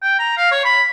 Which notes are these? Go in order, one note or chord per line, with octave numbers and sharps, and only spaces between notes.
G5
A#5
F5
C#5
B5